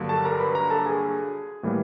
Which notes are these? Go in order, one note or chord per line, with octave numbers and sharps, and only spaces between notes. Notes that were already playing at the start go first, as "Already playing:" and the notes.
Already playing: G2 D3 F#3 A#3
A4 A5
A#4 A#5
A#5
B4 B5
A#4 A#5
A4 A5
G#4 G#5
A2 E3 G3 A#3